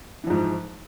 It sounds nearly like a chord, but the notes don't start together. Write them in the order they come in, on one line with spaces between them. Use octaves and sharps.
E3 F3 G#2